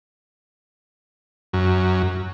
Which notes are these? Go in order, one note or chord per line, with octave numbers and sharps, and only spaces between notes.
F#2